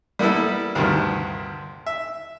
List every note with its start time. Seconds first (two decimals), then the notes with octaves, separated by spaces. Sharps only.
0.19 G3 A#3 B3 E4 A4
0.75 D2 G2 C3 D#3
1.86 E5